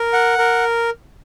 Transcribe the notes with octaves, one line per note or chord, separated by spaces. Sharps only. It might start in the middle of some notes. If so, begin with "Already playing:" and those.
Already playing: A#4
F#5
A#4